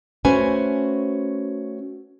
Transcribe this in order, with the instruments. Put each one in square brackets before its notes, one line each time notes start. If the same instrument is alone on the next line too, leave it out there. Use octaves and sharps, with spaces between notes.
[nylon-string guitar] A3 C#4 F#4 B4 C5 G#5